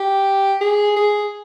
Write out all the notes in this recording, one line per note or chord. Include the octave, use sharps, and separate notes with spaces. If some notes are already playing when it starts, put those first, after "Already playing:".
Already playing: G4
G#4
G#4